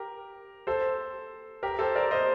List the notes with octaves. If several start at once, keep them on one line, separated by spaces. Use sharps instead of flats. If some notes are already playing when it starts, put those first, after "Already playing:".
Already playing: G4 A#4
A4 C5
G4 A#4
A4 C5
A#4 D5
C5 D#5